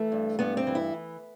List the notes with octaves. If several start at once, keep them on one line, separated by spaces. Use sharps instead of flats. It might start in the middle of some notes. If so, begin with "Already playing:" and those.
Already playing: E3 A3
G2
G2 B3
C4
E3
E4